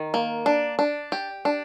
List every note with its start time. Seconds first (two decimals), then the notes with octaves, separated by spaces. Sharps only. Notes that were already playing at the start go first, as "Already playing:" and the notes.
Already playing: D#3
0.14 A#3
0.46 D4
0.79 D4
1.12 G4
1.45 D4